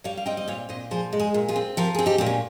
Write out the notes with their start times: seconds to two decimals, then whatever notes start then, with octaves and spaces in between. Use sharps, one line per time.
0.04 G3 C#5 F5
0.17 F5
0.26 C4 D#5 G5
0.37 D#5
0.48 A#2 C#5 F5
0.69 A#2 C5 D#5
0.91 F3 G#4 C5
1.13 G#3
1.20 G#4 C5
1.34 A#2
1.49 F4 G#4
1.56 C4
1.77 F3 G4 A#4
1.95 C4 G#4
2.06 D#4 G4
2.18 A#2 C4
2.26 C#4